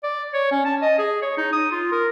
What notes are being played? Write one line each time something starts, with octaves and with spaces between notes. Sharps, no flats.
D5
C#5
C#4
A5
D#5
G#4
C#5
D#4
D#6
F4
A#4